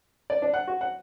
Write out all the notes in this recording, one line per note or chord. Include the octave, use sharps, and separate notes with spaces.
D5
D4
F#5
F#4
F#5